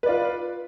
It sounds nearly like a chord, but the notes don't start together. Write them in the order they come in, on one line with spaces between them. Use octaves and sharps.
B4 D5 F4